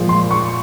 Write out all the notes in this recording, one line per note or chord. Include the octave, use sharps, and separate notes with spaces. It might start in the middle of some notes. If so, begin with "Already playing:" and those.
Already playing: A#2 F3 G#3
C6
C#6